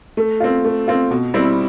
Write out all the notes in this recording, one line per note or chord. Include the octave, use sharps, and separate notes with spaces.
A3
C4 F4
A3
C4 F4
B2
G3 C4 E4